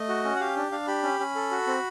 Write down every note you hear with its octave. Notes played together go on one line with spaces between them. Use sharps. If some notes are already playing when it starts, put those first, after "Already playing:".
Already playing: A3 D#5
F#4
C#4
F#5
G4 F5
D4
D4 F5
G4 B5
C#4
C#4
A4
F#4
C4